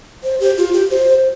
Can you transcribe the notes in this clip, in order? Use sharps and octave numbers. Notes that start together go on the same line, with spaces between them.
C5
G4
F4
G4
C5